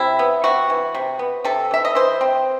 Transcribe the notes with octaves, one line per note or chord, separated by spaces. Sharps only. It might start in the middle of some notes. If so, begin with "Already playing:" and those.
Already playing: C3 E4
B3
C3 F#4
E3
C3
B3
C3 A4
E3 E5
D#5
E3 C5
C4